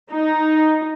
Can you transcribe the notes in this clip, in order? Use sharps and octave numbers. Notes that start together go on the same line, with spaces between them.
D#4